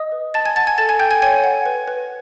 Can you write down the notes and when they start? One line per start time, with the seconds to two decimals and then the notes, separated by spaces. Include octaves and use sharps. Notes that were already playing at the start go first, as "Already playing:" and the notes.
Already playing: D#5 D#6
0.12 B4
0.34 D#5 A5 A6
0.45 G#5 G#6
0.56 F#5 A5 A6
0.67 G#5 G#6
0.78 A4 A5 A6
0.89 G#5 G#6
0.99 A4 G5 G6
1.11 G#5 G#6
1.22 C#5 G#5 G#6
1.44 F#5
1.66 B4
1.88 B4